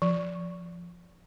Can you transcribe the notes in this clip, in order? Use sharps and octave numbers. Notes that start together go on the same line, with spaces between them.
F3